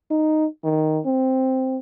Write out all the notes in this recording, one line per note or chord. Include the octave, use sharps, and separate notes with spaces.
D#4
D#3
C4